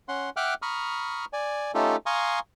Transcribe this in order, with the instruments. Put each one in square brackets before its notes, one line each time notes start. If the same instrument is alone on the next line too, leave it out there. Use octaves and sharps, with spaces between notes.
[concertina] C#4 F#5 C6
E5 F#5 G5 D6 F6 F#6
A#5 B5 C#6 D#6 F6
D5 G#5
A3 C#4 D#4 F4 G4 A4
F5 G#5 A#5 C6 C#6 D#6